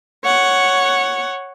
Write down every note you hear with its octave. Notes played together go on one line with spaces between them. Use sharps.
C#5 F#5